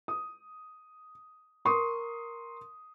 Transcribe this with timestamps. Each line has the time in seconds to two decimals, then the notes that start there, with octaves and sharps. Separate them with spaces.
0.08 D#6
1.65 A#4 C6 C#6 D#6